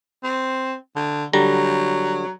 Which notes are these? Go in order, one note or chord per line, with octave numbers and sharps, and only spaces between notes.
C4
D3
D3 F#3 G3 A#5